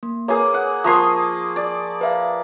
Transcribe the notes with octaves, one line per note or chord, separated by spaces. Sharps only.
A#3
A#3 G#4 B4 C#5 D6
F#5
F3 A#3 C6 C#6 D#6
D5
B4 E5 F5